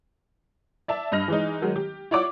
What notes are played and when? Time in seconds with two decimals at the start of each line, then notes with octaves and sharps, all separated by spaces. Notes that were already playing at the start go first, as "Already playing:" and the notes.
0.88 D5 E5 A5
1.12 G2 D#5 F6 A#6
1.28 E3 G#3 D#4
1.62 D#3 F#3 G#3
1.76 G4
2.11 E4 F4 C#5 D5 F#5 D6